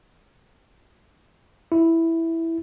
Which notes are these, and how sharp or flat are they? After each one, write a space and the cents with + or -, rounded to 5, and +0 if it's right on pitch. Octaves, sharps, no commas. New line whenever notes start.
E4 +0